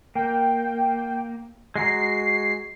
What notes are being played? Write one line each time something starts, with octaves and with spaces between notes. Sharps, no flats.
A#3 G5
G#3 F#4 A#5 C7